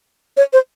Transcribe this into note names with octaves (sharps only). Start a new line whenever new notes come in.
C#5
C5